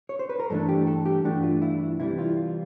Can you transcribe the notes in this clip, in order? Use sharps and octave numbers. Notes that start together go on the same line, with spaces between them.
C#5
C5
B4
A#4
G2 E3 A3 D4 A4
G4
A4
G4
G2 E3 A3 D4 F#4
F4
E4
C3 E3 G3 E4
F4
F4